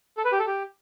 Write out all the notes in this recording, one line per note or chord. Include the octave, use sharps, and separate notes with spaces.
A4
B4
G4
A4
G4